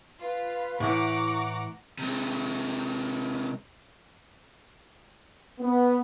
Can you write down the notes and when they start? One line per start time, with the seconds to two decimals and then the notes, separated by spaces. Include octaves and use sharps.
0.21 F4 B4
0.80 A2 E3 F#5 A#5 C#6 D6
1.99 C3 G#3
5.59 B3